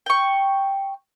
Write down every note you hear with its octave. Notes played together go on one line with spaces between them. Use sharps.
G5 C#6